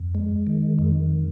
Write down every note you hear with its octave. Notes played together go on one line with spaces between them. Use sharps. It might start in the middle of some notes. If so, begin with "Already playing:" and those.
Already playing: F2
G#3
D#3
F2